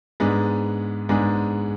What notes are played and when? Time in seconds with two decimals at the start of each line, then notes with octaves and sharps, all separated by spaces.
0.20 G#2 G#3 B3 D4
1.09 G#2 G#3 B3 D4